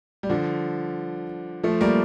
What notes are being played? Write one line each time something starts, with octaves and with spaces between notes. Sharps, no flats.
G3
D3 F3
F3 A3
G3 A#3